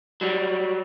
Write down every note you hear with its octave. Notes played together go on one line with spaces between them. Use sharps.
F#3 G3